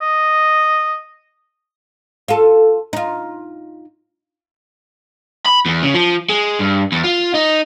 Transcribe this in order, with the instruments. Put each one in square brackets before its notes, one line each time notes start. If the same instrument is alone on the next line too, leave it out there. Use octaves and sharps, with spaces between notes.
[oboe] D#5
[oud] F4 A4
D#4 F4
[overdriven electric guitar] B5
E2
C#3
F3
G#3
G2
E2
F4
D#4